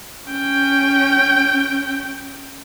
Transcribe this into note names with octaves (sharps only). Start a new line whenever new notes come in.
C#4 G5